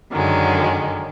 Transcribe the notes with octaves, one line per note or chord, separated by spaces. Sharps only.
F#2 D3 D#3 F#3 G#3